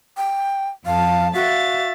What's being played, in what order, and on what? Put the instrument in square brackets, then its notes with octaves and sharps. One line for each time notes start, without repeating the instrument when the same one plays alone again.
[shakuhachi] G5
[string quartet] F2 A5 [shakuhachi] F5
[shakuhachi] F#4 [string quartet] E5 F5 A6